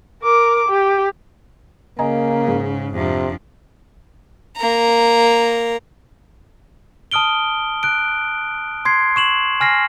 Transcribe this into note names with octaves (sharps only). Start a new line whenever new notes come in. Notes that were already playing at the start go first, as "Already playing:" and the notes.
A#4 D6
G4
C#3 A#3 D#5 G#5 A#5
G#2
F2 C3 D4
A#3 A#5
A5 D#6 F6 D7 G7
F#6 D7
C6 G#6 C7
C#6 E7 F#7
G#5 F6 A#6 C7